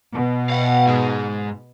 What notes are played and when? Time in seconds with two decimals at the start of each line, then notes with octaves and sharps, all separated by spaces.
0.13 B2
0.50 F5 F#5
0.87 G#2 G#3